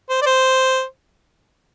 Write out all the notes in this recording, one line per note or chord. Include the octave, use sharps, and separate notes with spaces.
C5
D5
C5